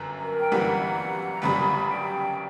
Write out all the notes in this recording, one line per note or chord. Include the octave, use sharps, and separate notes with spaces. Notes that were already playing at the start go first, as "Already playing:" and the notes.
Already playing: G1 F#2
A#4
G5
G1 F#2 E3 G3 F#5
A#5
G1 F#2 C#3 G3 B5
G5